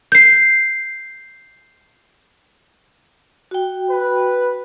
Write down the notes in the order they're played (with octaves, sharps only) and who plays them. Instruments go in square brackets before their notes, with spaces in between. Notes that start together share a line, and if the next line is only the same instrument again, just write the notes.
[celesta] G6 C7
[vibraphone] F#4 G5
[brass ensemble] B4